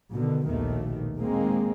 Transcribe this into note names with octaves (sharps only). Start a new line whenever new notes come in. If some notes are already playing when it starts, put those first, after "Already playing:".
B2 D3 D#3
A#1 D#2 B2 D#3 A3
D#3 G#3 A#3 C4